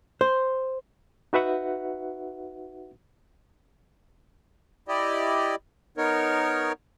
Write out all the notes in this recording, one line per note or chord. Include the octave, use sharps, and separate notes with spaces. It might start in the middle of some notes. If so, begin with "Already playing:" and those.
C5
D#4 F#4 B4 E5 F#5
E4 G4 D5 D#5
B3 D#4 A#4 C#5